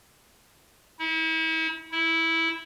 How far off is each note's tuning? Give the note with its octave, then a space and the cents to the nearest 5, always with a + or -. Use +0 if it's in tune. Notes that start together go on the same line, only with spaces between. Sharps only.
E4 -40
E4 -10